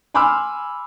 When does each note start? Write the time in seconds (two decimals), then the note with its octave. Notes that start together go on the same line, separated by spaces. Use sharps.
0.14 G#5 B5 C6 D6 E6 F6